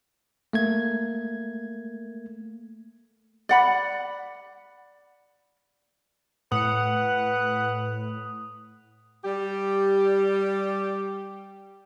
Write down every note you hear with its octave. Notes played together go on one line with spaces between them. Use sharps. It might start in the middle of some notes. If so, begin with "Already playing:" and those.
A3 A#3 G#6
D5 F#5 B5
A2 B4 F#5 D#6
G3 G4